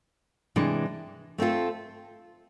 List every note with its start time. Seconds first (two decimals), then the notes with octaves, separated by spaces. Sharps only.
0.56 C3 E3 G#3 D4
1.38 A3 C4 F4 A4